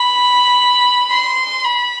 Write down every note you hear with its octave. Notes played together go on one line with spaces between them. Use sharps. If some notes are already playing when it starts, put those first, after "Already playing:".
Already playing: B5
C6
B5